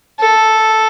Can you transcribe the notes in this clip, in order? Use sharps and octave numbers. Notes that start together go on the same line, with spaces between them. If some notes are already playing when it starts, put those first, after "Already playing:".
A4